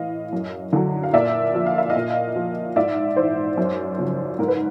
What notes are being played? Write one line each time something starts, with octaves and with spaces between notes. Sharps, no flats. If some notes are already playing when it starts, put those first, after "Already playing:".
Already playing: A2 E3 D#5 F5
F#2
D3 F#3
F5
A#2 D5 E5
F3
F5
E5
D#5 F5
A#2
F3
G#2 D5 E5
E3 C5 D5
F#2
C#3 F3
G#2 A#4
B4